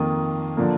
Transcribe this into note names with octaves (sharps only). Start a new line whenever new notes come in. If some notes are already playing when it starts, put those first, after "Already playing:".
Already playing: F2 D#3 A#3 D#6
D3 F3 A#3